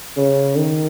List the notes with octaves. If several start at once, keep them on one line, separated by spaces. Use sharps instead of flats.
C#3
D#3